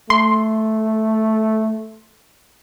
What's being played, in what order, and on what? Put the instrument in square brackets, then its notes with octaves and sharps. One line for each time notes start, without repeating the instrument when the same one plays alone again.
[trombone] A3 [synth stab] C6